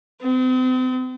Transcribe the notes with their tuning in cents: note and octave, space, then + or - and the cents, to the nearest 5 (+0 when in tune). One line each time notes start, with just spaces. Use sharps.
C4 -40